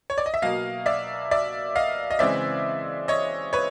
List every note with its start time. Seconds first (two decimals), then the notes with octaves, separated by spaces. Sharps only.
0.10 C#5
0.18 D5
0.26 D#5
0.34 E5
0.42 B2 F#3 A#3 D#5 F5
0.86 D5 E5
1.31 D5 E5
1.76 D#5 F5
2.11 D#5
2.19 C#3 E3 G#3 C4 D5 E5
3.08 C#5 D#5
3.53 B4 C#5